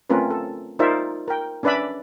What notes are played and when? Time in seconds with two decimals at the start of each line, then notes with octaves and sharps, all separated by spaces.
0.10 A3 C4 C#4 F4 A#4 B4
0.30 A4
0.79 D#4 F4 A#4 C5 D5 E5
1.28 A#4 G5
1.63 C#4 D4 B4 D5 E5 B5